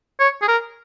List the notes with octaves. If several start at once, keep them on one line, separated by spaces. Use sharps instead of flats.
C#5
G#4
A#4